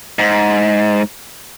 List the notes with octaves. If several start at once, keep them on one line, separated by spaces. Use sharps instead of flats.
G#2